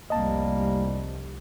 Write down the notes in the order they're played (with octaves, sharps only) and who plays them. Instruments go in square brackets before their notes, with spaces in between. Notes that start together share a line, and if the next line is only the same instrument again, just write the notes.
[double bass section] F1 C2 [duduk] G3 [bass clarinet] A#3 [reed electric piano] D#5 A5